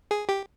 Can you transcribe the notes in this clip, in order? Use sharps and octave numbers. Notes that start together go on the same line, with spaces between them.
G#4
G4